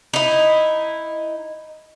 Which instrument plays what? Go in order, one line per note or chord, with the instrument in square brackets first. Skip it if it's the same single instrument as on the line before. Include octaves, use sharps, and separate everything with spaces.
[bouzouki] D#4 E4